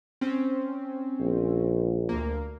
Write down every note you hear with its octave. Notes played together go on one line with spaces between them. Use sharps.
C4 C#4
A#1
D2 A#3